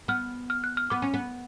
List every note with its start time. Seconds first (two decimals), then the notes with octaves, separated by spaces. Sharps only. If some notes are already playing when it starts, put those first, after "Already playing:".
0.08 B3 F6
0.50 F6
0.64 F#6
0.77 F6
0.90 B3 D6
1.02 C#4
1.14 B3